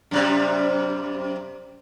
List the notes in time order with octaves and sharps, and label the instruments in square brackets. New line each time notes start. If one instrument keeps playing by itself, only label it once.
[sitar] F#2 C3 G3